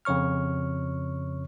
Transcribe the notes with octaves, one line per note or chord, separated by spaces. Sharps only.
F2 C#3 C#5 C#6 F6